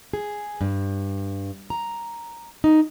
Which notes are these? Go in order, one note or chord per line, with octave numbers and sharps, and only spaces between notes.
G#4
G2
A#5
D#4